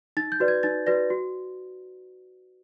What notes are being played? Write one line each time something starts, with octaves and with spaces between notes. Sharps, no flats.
D#4 A6
G6
F#4 B4 D5
G#6
D#4 A6
F#4 B4 D5 A#6
F#4